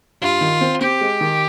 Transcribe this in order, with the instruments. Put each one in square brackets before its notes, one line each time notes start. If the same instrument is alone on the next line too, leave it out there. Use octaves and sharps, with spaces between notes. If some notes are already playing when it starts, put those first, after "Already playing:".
[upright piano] G2 [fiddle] F4
[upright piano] D#3
C4
[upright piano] C4 [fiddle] G4
[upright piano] G#3
D#3